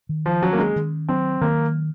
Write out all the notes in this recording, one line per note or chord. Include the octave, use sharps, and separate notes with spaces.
D#3
F3
F#3 C#4
A#3
G#3
D#3
F#3 C4
D#3 A#3